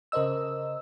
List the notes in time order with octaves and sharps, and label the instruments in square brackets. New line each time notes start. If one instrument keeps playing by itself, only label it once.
[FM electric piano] C#3 A#4 C5 D#5 E6